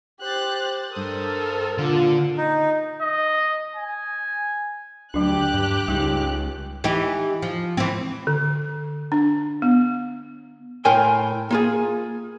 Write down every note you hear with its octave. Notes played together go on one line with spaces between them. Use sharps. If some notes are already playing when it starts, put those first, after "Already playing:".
G4 C5 F#6 A6
G2 A4 A#4 C5 D#6
A#2 D3 F4
D#4
D#5
G#5
D2 F#3 D4 G4 F#6
G2
C#2 G3 D#4
E3 D#4 G4
F3
E3 C4
D3
D4
B3
A2 A#4 G5 G#5 C6
A#3 F4 G#4